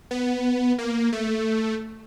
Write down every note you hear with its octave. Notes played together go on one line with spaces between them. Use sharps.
B3
A#3
A3